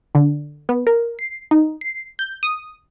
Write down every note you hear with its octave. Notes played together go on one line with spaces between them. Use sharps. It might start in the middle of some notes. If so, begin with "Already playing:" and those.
D3
B3
A#4
C7
D#4
C7
G6
D#6